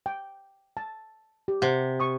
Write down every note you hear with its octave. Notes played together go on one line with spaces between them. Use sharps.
G5
A5
G4
C3 F#5
C#6 D#6